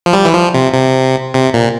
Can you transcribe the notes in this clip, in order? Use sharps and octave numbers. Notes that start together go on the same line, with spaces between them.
F3
G3
E3
F3
C3
C3
C3
A#2